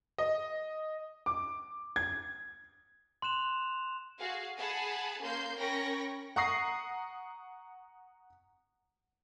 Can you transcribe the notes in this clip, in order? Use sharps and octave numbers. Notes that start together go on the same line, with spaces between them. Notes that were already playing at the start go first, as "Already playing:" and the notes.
D#5
D6
G#6
C6 F#6 E7 F7
F#4 G#4 F5
G#4 F#5 G#5 A5 B5
A#3 C#4 C6 G6
C#4 A#4 G5 B5 C#6 A#6
F#5 A#5 C#6 D#6 A#6 C7